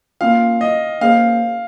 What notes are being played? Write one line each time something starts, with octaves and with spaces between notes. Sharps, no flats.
A#3 C#4 F4 F5
D#5
A#3 C#4 G#4 C5 F5